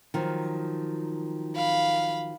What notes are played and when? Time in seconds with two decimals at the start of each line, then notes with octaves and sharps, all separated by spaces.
0.14 D#3 F3 F#3
1.56 F5 B5